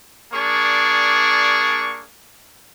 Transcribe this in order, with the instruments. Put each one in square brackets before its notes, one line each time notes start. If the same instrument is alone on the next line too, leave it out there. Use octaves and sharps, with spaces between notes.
[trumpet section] A#3 D4 G#4 D5 C#6